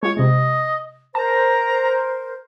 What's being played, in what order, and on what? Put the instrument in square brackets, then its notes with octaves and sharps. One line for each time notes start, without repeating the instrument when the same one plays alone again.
[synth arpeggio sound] G#3 F4 [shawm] C#5
[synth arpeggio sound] C3 G#3 [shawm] D#5
[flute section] A#4 C5 [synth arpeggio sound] A5 [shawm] A#5